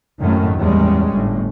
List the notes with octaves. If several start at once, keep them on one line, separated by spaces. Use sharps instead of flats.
G#1 F#2 A2 D#3 A3 C#4
A1 E2 G3 G#3 C#4
G1 A2